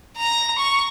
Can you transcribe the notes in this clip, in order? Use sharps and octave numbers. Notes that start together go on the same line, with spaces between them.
A#5
C#6